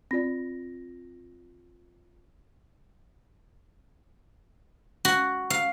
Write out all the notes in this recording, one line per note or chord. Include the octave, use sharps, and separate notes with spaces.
C4 F4 D5 A#6
F#4
F5